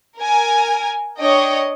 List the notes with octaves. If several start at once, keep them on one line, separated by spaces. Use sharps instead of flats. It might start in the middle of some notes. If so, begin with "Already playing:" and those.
A#4 G#5
D4 C#5 D#5 G5